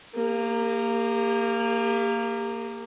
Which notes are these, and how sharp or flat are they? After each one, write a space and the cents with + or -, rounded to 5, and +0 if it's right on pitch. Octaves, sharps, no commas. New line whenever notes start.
A#3 -15 G4 +35